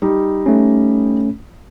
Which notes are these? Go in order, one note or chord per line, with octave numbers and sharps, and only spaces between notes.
G3 D#4
A3 C#4